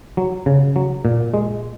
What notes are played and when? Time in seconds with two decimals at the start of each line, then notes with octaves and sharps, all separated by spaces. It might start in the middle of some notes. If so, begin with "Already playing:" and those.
0.17 F#3
0.46 C#3
0.76 F#3
1.05 A#2
1.34 G#3